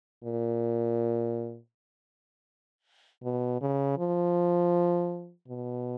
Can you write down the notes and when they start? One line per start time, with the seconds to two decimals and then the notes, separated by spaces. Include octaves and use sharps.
0.23 A#2
3.23 B2
3.61 C#3
3.98 F3
5.48 B2